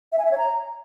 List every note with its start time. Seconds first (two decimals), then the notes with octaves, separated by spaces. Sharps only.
0.12 E5
0.19 G#5
0.25 E5
0.31 C#5
0.38 A#5